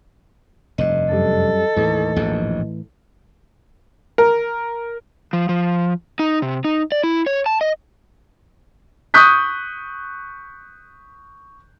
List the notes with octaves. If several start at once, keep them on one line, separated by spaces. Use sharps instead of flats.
F1 G2 D#5
F#2 G3 A4
D#2 A2 E3
A#1 D#2 G#2
A#4
F3
F3
D#4
C3
D#4
D5
E4
C#5
A5
D#5
C#6 D#6 F#6 G6 B6